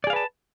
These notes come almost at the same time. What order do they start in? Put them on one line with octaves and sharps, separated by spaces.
D5 G#4 F5 B4 A5